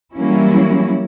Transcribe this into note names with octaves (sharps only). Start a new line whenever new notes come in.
E3 F#3 G3 A#3 C#4 E4